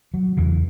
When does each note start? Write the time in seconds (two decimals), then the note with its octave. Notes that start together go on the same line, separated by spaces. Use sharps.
0.14 F#3
0.37 E2 C#3 E3